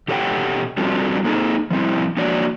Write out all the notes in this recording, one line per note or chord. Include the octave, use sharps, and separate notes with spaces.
B2 G4 A4 C#5 F#5 G5
G3 C4 D4 F4 F#4 A4
A#3 C4 D#4 G#4 A4
F3 G3 C4 E4
F3 A#3 D4 F#4 C#5 D5